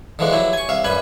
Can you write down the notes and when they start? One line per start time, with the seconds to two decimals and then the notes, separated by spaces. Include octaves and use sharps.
0.19 D3 E3 F3 G#3 F#4
0.32 F#3 E4 G4
0.53 G#5 C#6
0.69 C2 E5 F5
0.84 F#2 G3 B4 G#5 B5